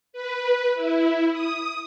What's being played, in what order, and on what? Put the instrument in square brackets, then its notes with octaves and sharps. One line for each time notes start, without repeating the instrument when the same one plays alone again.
[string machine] B4
E4
D#6